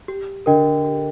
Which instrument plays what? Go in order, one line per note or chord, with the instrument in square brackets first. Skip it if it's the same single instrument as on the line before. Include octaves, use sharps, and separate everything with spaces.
[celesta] G4
[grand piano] D3 [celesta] A#4 D#5 G5
[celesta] G4